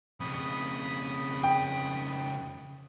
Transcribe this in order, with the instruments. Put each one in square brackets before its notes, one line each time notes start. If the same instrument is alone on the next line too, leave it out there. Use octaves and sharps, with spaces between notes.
[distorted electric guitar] F2 C#3 [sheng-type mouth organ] B5 D#6
[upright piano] G5